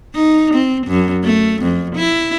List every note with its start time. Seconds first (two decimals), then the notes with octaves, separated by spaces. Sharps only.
0.14 D#4
0.54 C4
0.87 F#2
1.24 A3
1.62 F2
1.96 E4